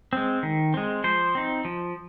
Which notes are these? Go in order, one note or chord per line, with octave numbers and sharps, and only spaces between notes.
G#3 C4
D#3
G#3 C4
F3 C5
C4 D#4
F3